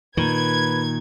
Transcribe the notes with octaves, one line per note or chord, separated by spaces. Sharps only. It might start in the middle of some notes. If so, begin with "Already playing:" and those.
A#2 D#3 B4 G#6